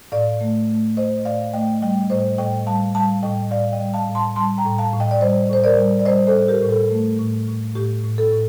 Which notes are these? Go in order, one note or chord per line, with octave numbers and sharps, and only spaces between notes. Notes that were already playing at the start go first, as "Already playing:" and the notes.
A2 D5 F5
A3
A3
A3 C5 D#5
A2 D5 F5
A3 D#5 G5
G3 D#5 G5
A2 C5 D#5
A2 D#5 G5
G3 F5 A5
G3 F5 A5
A2 D#5 G5
A2 D5 F5
D#5 G5
G3
F5 A5
A2
A5 C6
G3 A5 C6
G5 A#5
A2
F5 A5
A2
D#5 G5
D5
G3 C5 D#5
A2 C5
A#4 D5
G3
D5
G3 C5 D#5
A4 C5
A2
G4 A#4
A2
A4
A3
A2
A2
A2 G4
A2
A4
A2